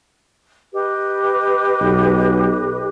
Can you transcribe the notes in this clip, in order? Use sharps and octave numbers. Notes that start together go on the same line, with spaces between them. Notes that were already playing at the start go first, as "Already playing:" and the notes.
G4 B4 D#5
B1